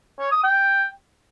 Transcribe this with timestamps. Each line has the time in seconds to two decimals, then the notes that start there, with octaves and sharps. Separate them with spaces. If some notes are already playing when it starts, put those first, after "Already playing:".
0.20 C#5
0.32 D#6
0.44 G5